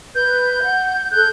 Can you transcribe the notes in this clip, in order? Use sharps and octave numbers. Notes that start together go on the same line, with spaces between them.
B4 G6
F#5
A4 F#6 G6